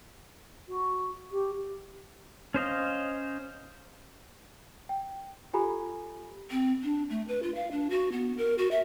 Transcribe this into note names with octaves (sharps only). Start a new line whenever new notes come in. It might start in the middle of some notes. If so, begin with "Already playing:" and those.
F#4
G4
C#4 C5 D#5 F5
G5
F4 G4 A4 G#5 A#5 B5
C4
D4
A3
B4
F4
F5
D4
F#4
B3
A#4
F#4
E5